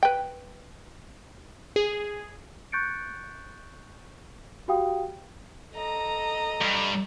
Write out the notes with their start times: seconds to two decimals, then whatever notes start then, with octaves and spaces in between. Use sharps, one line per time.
0.03 B4 G5
1.76 G#4
2.72 C#6 F#6 G6 A6 C#7 D7
4.68 F#4 G4 F5 G5 D#6
5.74 A4 D#5 A#5
6.61 G2